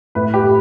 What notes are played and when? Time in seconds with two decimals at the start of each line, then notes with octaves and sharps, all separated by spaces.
0.15 A2 B4
0.34 G4
0.43 A2